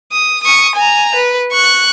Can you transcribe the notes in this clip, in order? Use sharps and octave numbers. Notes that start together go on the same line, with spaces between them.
D#6
C#6 D#6
G#5 A#5
B4
C#6 F#6